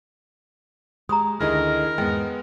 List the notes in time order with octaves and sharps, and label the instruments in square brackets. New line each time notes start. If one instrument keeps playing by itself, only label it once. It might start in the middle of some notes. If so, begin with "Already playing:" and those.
[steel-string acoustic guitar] G#3 G4 [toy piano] A#5 C#6 D#6
[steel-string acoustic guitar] D2 D3 D#5 [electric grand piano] D#3 E4 G#4 [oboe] A#4
[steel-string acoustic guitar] E2 G#2 [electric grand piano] G#3 B3 [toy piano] D#5 G5